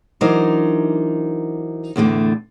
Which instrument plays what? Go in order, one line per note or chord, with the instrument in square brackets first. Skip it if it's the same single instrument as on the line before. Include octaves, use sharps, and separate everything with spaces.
[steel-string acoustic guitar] E3 F#3 D4 D#4 A#4 C5
E2 A2 D3 A3